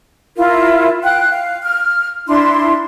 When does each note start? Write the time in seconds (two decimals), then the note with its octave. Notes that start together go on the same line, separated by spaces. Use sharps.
0.36 E4 F4 A#4
1.04 F5 G5 F#6
1.30 F5
1.64 F6
2.28 D4 E4 C6